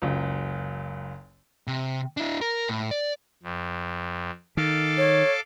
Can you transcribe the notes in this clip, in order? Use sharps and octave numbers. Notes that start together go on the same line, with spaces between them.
F#1 C#2
C3
D4 E4
A#4
A2
D5
F2
D#3 A4 F5 D6
C#5